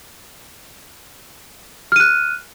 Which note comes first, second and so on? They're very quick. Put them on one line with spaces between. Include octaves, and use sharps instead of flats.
F6 D#7 F#6